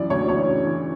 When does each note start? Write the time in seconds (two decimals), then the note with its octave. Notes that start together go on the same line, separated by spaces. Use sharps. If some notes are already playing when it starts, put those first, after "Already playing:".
Already playing: F#2 E3 D5
0.10 D2 C#5
0.28 D2 C#5
0.48 C#3
0.66 E3